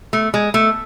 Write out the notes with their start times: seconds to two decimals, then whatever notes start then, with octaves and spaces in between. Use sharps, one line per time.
0.13 A3
0.34 G#3
0.54 A3